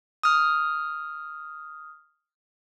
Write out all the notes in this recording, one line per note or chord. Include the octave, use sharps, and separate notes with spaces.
D#6 F6